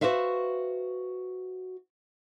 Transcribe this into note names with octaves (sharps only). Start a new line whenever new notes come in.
F#4 G#4 B4 C5 E5 F5